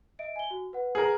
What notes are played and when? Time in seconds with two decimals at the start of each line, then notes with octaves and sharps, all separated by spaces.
0.19 D#5 E5 D7
0.36 G#5 G7
0.51 F#4
0.73 B4 F#5
0.95 G#4 A#4